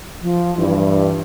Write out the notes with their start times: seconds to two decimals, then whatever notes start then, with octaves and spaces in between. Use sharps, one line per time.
0.22 F3
0.58 G2 E3